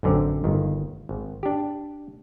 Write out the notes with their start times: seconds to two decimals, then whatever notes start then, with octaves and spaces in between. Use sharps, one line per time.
0.03 A1 F#2 D3 C4 D5
0.44 G1 D#3
1.09 G#1
1.43 D4 G4